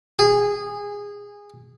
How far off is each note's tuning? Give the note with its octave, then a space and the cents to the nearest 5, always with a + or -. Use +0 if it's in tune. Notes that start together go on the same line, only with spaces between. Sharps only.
G#4 -20